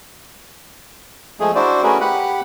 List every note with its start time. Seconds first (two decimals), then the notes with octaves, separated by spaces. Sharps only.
1.40 F3 G#3 A3 G#4
1.55 D4 E4 F#4 C5 D5
1.83 A3 C#4 F#4 G#4 A#4 B4
2.01 G4 F#5 B5 F#6